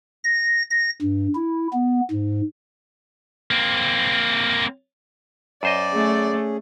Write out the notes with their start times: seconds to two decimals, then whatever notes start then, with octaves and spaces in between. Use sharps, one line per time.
0.24 A#6
0.71 A#6
1.02 G2
1.35 E4
1.73 B3
2.11 G#2
3.51 A#3 C4
5.63 F#2 C5 D5 D#5
5.94 A3 C#4 G#4